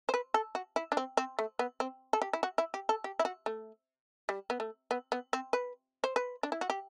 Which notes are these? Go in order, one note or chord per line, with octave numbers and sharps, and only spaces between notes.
C5
B4
A4
F#4
E4
D4
C4
C4
A3
B3
C4
A4
G4
E4
F#4
E4
G4
A4
G4
E4
F#4
A3
G3
B3
A3
B3
B3
C4
B4
C5
B4
D4
E4
F#4
G4